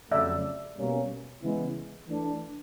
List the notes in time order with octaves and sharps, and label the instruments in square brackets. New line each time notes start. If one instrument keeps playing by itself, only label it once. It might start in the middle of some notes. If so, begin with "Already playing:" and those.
[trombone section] F2 C#3 F#3 A3 [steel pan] D5 E5
[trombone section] B2 G3 A#3 C#4
C#3 E3 G#3 B3 E4
E3 A3 D4